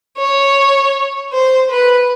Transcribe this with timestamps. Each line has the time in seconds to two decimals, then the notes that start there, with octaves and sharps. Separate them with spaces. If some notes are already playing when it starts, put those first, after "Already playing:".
0.17 C#5
1.32 C5
1.71 B4